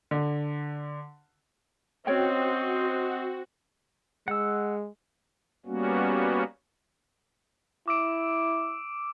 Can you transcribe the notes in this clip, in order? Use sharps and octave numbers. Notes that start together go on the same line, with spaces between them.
D3
C4 C#4 F#4 C5 C#5 D#5 G5
G#3 F#5 E6
G3 A#3 B3 C#4 F#4
E4 D6 E6 D7